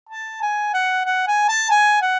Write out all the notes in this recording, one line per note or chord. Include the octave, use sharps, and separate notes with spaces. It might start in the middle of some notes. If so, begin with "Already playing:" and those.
A5
G#5
F#5
F#5
G#5
A5
G#5
F#5